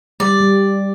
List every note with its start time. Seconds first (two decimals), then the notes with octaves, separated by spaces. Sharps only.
0.20 G3 D5
0.40 G3